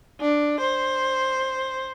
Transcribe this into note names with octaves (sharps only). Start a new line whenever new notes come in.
D4
C5